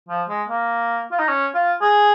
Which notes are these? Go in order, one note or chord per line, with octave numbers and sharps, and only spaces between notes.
F3
G#3
A#3
F4
D#4
C#4
F4
G#4